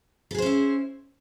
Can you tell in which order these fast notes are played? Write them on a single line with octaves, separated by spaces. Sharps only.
A4 G#4 C5 C#4 E4